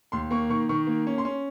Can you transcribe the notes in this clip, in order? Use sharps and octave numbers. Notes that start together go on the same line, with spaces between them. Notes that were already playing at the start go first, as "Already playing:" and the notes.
D#2 C6
A#3 C#6
D#3 C#6
D#3 C#6
A#3
C#4
C6
C#4